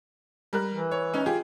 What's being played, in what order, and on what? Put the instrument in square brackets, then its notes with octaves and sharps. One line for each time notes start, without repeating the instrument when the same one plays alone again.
[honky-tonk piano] G3 A#4 F#6
[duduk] E3
[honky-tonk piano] C#5
C#4 D#4 C#5
[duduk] F4 [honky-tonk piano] G4 G#4